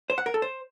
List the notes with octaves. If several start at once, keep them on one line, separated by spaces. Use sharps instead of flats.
C5
F#5
A#4
A4
C5